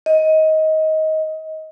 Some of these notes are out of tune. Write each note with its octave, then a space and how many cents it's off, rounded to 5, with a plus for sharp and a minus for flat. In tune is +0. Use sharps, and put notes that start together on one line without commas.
D#5 +20